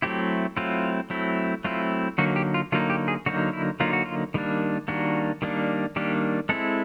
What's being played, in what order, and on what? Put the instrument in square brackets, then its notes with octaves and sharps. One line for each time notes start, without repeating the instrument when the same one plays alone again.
[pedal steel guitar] F#3 A3 C4 E4 G4
F#3 A3 C4 E4 F4
F#3 A3 C4 E4
F#3 A3 C4 E4 F4
D3 F#3 A#3 D#4 F#4
G4
F4
D3 F#3 A#3 D#4 F4
G4
G#4
D3 F#3 A#3 D#4 F#4
E4
D3 F#3 A#3 D#4 F4
F#4
F4
D#3 G3 A#3 D4
D#3 G3 A#3 D4 F#4
D#3 G3 A#3 D4
D#3 G3 A#3 D4 G4
G#3 C4 E4 A4